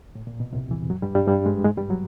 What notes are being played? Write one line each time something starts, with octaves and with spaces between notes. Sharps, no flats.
A2
A#2
B2
C2 C3
E2 E3
F#2 F#3
G2 G3
G2 G3
G2 G3
G#2 G#3
G#2 G#3
G2 G3
F#3